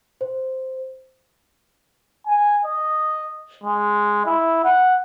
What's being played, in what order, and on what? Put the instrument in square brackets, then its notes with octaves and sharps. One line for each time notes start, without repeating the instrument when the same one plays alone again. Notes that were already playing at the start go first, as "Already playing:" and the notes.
[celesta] C5
[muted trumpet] G#5
D#5
G#3
E4
F#5